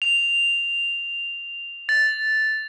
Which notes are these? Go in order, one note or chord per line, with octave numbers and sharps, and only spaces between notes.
F7
A6